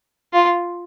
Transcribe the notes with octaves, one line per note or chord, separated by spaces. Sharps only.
F4